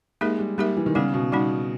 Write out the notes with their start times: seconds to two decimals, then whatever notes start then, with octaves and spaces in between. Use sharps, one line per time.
0.21 G#3 A#3 D#4 G4 A#4 E5
0.39 G3
0.58 G3 A#3 D#4 G4 A#4 E5
0.77 E3
0.86 D#3
0.95 C#3 G3 B3 D#4
1.14 B2
1.32 B2 G3 B3 D#4